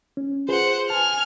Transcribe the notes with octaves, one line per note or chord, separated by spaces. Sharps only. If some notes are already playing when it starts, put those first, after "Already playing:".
C#4
F4 G#4 B4 C5 F#5
G#5 A5 F6